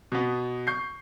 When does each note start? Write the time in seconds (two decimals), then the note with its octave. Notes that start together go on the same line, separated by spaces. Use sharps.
0.12 B2 B3
0.67 C#6 G6 C7